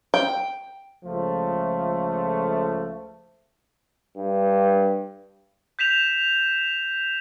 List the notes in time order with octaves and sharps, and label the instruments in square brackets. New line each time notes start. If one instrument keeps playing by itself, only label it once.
[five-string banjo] G5
[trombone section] C#2 F3 A3
[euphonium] G2
[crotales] G6 B6 E7 F7